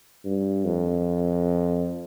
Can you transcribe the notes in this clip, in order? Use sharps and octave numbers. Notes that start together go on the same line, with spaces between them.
G2
F2